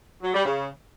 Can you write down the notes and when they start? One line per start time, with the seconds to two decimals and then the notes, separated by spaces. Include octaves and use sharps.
0.23 F#3
0.34 G3
0.45 C#3